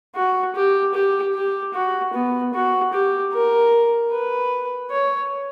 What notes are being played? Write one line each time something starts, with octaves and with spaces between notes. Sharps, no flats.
F#4
G4
G4
G4
F#4
B3
F#4
G4
A#4
B4
C#5